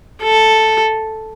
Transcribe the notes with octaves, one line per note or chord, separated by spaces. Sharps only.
A4